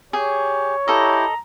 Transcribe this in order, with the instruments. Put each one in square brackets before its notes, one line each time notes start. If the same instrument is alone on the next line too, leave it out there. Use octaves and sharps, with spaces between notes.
[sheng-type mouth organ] G4 [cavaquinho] G#4 [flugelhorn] C#5
[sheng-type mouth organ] E4 G4 [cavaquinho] A4 D#5 [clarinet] A#5